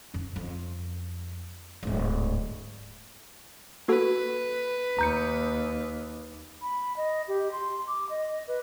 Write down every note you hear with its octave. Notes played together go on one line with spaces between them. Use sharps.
F2 D3
F2
D1 G#2
A#3 F#4 A4 B4
D#2 A#5 G6 C#7
B5
D#5
G4
C6
D6
D#5
B4